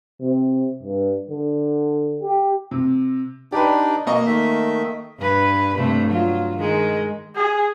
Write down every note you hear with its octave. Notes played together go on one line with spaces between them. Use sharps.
C3
G2
D3
G4
C3
D4 D#4 G4 B4 D5
B2 A#3 D#5 C#6
D#3 A3 E5
G2 B4
G2 C3 A3
F#3 F4
D#3 G#3
G#4